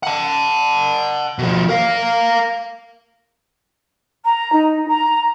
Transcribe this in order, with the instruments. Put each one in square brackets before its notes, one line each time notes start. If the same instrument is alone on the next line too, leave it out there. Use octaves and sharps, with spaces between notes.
[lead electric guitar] F#5 A5
B2 F3
A#4 F5
[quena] A#5
D#4
A#5